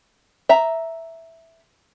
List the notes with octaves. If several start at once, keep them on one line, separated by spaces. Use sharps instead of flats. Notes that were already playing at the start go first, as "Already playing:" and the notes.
E5 A#5